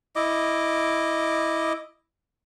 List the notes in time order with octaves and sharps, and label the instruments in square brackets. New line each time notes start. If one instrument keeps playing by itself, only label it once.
[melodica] E4 D#5 D6